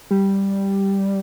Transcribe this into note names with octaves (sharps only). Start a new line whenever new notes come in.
G3